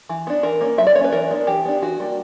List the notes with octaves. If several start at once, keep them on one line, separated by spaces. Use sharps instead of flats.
E3
B3 D4
E3 A#4
A#3 C#4
F#3 E5
D5
A#3 C#4 B4 C#5
E3 A#4
B3 D4
E3 G4
B3 D4
E3 F#4
G3 A#3 D4